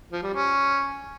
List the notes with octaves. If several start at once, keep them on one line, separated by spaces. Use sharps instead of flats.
F3
G3
C#4